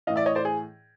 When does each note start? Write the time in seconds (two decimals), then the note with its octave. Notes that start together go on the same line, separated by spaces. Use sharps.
0.07 E3 D#5 F5
0.10 A2
0.16 D5 E5
0.26 C#5 D#5
0.35 C5 D5
0.45 G#4